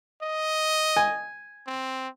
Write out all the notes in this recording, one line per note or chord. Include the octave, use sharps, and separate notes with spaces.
D#5
G#5
C4